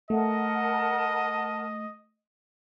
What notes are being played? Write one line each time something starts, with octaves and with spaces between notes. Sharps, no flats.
A3 A#4 D#5 F#5 A5